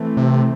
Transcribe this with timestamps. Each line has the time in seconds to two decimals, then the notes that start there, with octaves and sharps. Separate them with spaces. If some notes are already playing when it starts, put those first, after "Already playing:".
Already playing: E3 A3 C4
0.17 C3